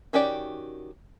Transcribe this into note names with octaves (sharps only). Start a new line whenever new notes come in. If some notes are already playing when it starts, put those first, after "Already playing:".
D#3 C#4 F#4 G4 D5